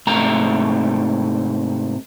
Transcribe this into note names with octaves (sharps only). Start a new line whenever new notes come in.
G#2 C3 A3 A#5